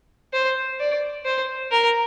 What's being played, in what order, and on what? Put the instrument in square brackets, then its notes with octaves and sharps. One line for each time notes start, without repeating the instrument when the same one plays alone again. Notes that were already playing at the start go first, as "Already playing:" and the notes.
[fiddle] C5
D5
C5
A#4